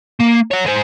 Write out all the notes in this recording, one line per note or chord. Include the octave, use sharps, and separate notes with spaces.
A#3
C#5 F#5
G#3 C5